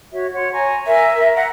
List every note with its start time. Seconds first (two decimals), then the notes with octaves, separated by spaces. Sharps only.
0.13 F#4 C#5 E5
0.34 C#5 F#5 C6
0.52 G#5 A#5 C#6
0.87 A#4 E5 G#5
1.16 A#4
1.36 F#5